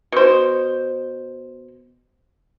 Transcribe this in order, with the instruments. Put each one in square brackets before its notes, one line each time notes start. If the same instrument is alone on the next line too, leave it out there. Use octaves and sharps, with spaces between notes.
[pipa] B2 C5